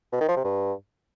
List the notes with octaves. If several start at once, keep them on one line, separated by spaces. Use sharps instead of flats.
B2
D#3
F3
C3
G2